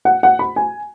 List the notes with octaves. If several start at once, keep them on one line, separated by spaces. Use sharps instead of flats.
F#5
F#5
B5
G#5